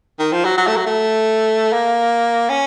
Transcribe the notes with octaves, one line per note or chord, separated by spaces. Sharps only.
D#3
F3
F#3
F#3
A3
F#3
A3
A#3
C#4